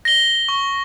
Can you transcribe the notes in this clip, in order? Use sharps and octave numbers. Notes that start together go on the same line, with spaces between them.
A#6 G7
C#6